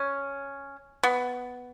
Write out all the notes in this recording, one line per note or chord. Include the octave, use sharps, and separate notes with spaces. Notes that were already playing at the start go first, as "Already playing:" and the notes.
Already playing: C#4
B3